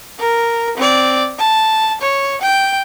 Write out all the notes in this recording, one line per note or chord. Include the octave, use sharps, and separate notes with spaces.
A#4
C4 D5
A5
C#5
G5